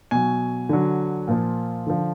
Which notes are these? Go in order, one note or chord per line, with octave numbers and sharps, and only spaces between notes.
B2 F#3 G#5
D3 F#3
A#2 F3
D3 F3